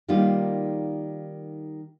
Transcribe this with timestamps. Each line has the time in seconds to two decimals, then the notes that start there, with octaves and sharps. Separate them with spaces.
0.08 D#3 G3 A#3 D#4 F4